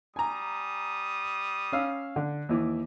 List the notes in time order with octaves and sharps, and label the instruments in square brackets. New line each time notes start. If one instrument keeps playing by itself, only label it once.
[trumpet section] G3 D#6 [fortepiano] G#5 A#5
[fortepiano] C#4 F5 E6
D3
D#2 E3 D6